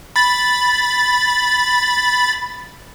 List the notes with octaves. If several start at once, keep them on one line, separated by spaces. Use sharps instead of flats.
B5 A6